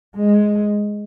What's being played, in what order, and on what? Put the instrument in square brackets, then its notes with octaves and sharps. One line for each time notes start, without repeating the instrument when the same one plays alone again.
[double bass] G#3